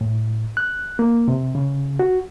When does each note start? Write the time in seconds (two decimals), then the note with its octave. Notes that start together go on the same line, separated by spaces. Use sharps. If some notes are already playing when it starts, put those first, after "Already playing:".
0.01 A2
0.57 F#6
0.99 A#3
1.28 C3
1.55 C#3
1.99 F#4